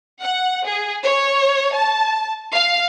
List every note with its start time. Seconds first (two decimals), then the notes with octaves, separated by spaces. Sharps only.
0.22 F#5
0.65 G#4
1.04 C#5
1.75 A5
2.53 F5